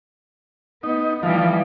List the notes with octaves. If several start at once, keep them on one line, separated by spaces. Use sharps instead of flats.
B3 D#4
E3 F3 G3